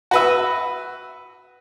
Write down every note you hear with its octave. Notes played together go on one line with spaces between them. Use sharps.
F#4 B4 E5